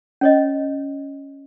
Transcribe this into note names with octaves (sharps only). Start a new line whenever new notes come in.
C#4 C#5 D#5